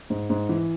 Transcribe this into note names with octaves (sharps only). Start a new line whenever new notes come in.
G#2
G#2
E3